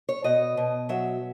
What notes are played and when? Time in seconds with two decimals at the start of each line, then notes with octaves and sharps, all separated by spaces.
0.09 C#5
0.24 B2 D#5
0.57 B2
0.89 F#3 E5